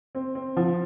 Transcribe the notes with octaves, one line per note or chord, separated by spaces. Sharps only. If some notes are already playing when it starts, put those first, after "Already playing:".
C4
C4
F3